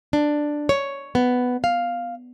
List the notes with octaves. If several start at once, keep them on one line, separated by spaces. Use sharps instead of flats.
D4
C#5
B3
F5